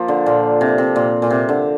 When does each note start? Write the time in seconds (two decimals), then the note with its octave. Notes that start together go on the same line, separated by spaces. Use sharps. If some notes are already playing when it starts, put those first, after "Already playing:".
Already playing: F3 A#3
0.08 D3
0.26 A#2
0.61 C3
0.78 C3
0.96 A#2
1.22 A#2
1.30 C3
1.49 D3